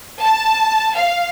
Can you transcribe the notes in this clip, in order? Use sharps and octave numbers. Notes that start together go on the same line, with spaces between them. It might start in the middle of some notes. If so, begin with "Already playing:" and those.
A5
F5